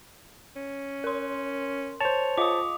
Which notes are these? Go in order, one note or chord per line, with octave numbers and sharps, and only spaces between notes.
C#4
A#4 C6
C5 C#5 A5 F7
F4 D#5 F5 D6 D#6